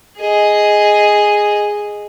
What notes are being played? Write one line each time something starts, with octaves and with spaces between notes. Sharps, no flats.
G#4 D#5